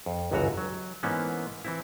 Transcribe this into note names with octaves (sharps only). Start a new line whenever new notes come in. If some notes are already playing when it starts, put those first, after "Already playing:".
F2
G1 C#2 F#2 E3 F#4 A#5
F#3
G#2 E3 A#3 B3 C#4
E3 C4 E4